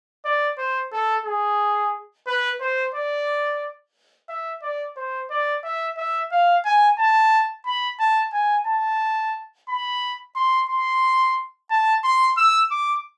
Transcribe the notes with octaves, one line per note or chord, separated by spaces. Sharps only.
D5
C5
A4
G#4
B4
C5
D5
E5
D5
C5
D5
E5
E5
F5
G#5
A5
B5
A5
G#5
A5
B5
C6
C6
A5
C6
E6
D6